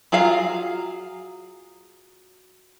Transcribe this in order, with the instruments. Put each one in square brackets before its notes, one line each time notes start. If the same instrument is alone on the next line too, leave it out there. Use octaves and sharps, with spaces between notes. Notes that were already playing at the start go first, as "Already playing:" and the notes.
[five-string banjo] F#3 F4 G#4 F5 A#5